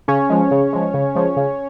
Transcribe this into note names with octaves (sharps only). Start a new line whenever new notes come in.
C#3 C#4 C#5
F3 G#3
C#3
F3 G#3
C#3
F3 G#3
C#3